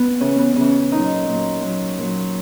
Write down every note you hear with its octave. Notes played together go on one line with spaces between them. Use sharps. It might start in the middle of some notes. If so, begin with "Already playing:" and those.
Already playing: B3
C#3 E3 C#4
B3
C#3 E3 C#4
A#2 F#3 D#4
A#2 F#3
A#2 F#3
A#2 F#3